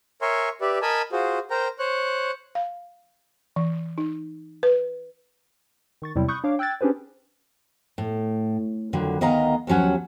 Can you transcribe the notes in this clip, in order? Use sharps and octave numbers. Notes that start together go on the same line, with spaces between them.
A#4 C#5 E5 G#5 C6
G4 B4 D5 E5
A#4 D#5 G#5 A5 B5
F4 F#4 G#4 C5
A#4 C5 G5 A#5
C5 C#5 F#6
F5
E3
D#4
B4
D#3 C#6 A6
E2 C3 F#3 G3 E4
B5 C#6 D#6 F#6 G6
D4 C#5 F5 D6
G5 E6 F#6 G#6 A6
C#4 D4 G4 G#4 B4 C5
A2
F2 D3 D#3 F#3
D2 D#3 B3 D#5 F5 A#5
D#2 F3 F#3 C#4 F#5